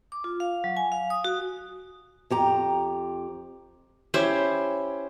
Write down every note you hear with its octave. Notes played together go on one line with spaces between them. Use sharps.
D6
F4
F5
F#3
G#5
F5
D#6
F#4
F2 G4 A#5
C#4 E4 G4 C5